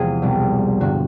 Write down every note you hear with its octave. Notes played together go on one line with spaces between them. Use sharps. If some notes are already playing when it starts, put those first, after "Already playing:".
Already playing: E2 C3 F3 G#3 G#4
C2 B2 G3
G2 D3 F#4